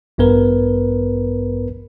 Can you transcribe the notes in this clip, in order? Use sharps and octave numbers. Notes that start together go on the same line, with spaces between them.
A1 G2 B3 A#4 B4